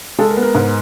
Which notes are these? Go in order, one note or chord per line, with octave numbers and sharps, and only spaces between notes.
G#3 A4
A#4
B3
A#4
G#2